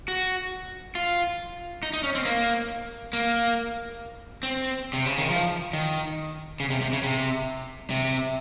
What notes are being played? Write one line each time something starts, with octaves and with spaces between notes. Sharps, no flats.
F#4
F4
D#4
D#4
C#4
C4
A#3
A#3
C4
C3
C#3
D#3
F3
D#3
C#3
C3
C3
C#3
C3
C3